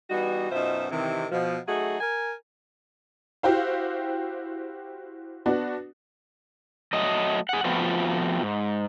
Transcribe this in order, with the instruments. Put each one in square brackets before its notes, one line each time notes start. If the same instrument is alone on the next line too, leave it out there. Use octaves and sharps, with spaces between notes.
[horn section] E3 G3 B3 D#4 F#4
F#2 B2 D#4 F4 C5 E5
C3 D#3 E3
B2 F3
F#3 A3 D#4 F#4 G#4
A#4 G#5
[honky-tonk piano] E4 F#4 G4 C5 F5
B3 D4 F#4
[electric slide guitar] F#3 A3 D#5
G#4 F#5
F3 A3 B3 C4 F4 F#4
G#2